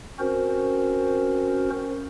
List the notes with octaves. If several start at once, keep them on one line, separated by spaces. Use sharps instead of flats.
C4 C#4 F#4 A#4 C5